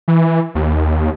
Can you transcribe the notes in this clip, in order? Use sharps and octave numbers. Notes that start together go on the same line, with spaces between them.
E3
D#2